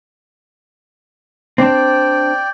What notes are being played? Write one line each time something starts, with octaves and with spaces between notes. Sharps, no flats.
C4 D4 D5 G5